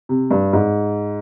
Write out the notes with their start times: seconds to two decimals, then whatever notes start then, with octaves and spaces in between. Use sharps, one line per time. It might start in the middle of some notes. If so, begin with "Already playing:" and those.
0.09 C3
0.31 G2
0.53 G#2